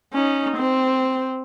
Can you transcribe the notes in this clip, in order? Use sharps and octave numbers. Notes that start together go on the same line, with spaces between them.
C#4 D#4
C4